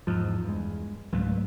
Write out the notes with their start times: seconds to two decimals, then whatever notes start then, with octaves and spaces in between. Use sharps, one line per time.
0.07 E2 G#2 F3
0.44 G2 G#3
1.13 C#2 G#2 F#3 A3